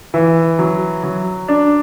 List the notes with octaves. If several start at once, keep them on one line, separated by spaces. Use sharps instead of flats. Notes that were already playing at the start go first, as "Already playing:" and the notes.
E3
F#3
F#3
D4